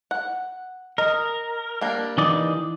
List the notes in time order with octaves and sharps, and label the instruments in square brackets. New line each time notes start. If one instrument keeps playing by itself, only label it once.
[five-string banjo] F#5
[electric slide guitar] A#4 [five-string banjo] D#5
[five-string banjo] G3 A#3 D4
[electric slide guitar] E3 D#4 D5